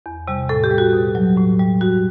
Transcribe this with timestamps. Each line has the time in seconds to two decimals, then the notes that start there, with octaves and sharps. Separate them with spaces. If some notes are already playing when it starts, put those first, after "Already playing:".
0.06 E2
0.28 C3 G3
0.49 A2 A4
0.64 G4
0.71 G3
0.78 F#4
0.93 B2
1.15 F#3
1.37 A2
1.59 G3
1.81 G2 F#4